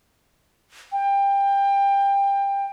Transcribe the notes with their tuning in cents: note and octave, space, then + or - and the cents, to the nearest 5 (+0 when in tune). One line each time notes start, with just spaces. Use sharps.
G5 +20